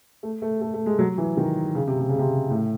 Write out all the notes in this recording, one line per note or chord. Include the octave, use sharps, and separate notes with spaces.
A3
A3
A3
A3
G#3
F#3
E3
D#3
C#3
C3
C3
C#3
C3
A2